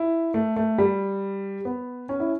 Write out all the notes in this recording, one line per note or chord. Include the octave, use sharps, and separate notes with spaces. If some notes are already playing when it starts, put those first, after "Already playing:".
Already playing: E4
A3
A3
G3
B3
C#4
E4